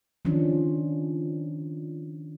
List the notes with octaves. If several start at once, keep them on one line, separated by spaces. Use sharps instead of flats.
D#3 F3 C#4 D4